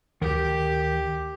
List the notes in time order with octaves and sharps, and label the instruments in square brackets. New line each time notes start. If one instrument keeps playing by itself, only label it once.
[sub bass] D2 [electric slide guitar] D#3 A#4 [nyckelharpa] G4